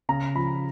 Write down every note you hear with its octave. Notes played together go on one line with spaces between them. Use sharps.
C#3 A#5
F3 B5